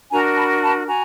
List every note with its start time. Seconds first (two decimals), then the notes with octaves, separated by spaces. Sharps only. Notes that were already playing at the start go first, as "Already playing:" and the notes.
0.10 D4 F#4 A#4 G#5 A#5
0.36 A5 B5
0.62 A5 B5
0.88 F#4 G#5 A#5